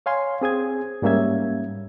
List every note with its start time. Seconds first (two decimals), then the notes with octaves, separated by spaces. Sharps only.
0.06 C#5 F5 G#5 C6
0.42 C4 G#4 D#6 G#6
1.02 G#2 G3 A#3 C#4 E5 G#6